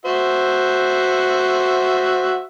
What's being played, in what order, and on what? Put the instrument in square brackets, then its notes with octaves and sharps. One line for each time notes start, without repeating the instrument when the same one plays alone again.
[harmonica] F#4 C5 E5